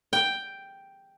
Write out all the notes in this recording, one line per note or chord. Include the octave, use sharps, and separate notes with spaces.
G5